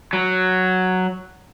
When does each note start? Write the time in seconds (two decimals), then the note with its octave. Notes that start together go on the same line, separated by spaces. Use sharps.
0.13 F#3